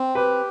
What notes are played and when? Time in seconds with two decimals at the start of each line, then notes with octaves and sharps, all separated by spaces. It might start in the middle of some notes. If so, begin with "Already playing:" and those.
Already playing: C4
0.15 G4 B4